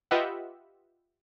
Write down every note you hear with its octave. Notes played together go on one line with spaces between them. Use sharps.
F4 G4 B4 D#5 E5 F#5